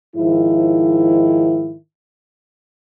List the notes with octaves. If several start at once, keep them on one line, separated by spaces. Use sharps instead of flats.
G#2 D#3 F3 E4